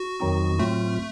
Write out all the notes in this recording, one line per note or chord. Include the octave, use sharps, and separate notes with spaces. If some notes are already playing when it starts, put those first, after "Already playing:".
Already playing: F#4
F2 D#3 F#3 C4 D#4
A2 F#3 A3 C4 F4